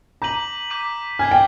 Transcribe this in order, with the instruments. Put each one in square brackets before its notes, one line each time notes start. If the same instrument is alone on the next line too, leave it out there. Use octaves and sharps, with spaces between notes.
[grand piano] A#5 [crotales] D6 G6 B6 D#7 F#7
[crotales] D6 G6 B6 D#7 F#7
[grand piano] G#5 [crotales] F6 G#6 C7
[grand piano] G5